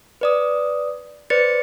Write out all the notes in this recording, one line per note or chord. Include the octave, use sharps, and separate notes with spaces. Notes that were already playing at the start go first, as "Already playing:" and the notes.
B4 D5 D#6
B4 C5 D5 A6 C#7